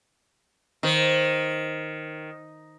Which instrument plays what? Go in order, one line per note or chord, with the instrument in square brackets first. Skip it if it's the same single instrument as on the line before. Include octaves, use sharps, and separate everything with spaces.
[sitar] D#3 [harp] C5 C7